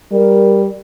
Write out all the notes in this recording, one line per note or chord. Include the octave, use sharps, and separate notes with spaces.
G3 A#4